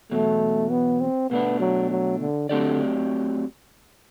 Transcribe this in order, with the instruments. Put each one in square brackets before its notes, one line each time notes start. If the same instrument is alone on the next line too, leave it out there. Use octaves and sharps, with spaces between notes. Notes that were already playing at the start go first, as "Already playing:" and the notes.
[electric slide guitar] E2 B2 F#3 [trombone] A3
[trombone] B3
C4
[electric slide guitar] B2 A3 D4 [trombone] B3
[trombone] F#3
F#3
D3
[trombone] D3 [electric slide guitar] F#3 A3 C4 G4 D5